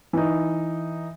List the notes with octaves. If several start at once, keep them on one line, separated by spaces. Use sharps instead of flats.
E3 D#4